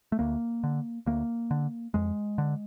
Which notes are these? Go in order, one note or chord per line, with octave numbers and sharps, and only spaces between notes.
A3
D2 A#3
D3
D2 A#3
D3
F2 G#3
D3